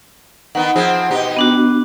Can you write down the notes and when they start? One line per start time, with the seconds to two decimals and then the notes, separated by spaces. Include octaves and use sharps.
0.55 D#3 B3 D#4 F#5
0.76 F3 C4 G#4
1.11 B2 D#4 G4
1.36 B3 D4 F#4